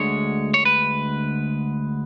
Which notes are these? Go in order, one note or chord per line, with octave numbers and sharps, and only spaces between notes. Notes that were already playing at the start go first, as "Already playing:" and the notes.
Already playing: D2 D3 G#3 C#5
C#5
B4